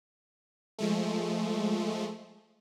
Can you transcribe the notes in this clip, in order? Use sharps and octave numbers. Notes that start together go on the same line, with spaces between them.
F3 G#3 A3